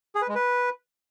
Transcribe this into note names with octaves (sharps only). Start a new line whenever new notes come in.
G#4
B4
G#3
B4